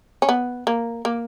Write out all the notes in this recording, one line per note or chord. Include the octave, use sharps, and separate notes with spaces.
C#4
B3
A#3
A#3